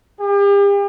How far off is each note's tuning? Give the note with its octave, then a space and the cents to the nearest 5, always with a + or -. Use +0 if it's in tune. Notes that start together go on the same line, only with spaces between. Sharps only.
G4 +40